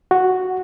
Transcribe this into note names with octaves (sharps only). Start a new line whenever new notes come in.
F#4